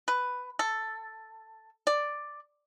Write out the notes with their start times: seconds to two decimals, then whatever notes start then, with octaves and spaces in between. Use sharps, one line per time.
0.08 B4
0.59 A4
1.87 D5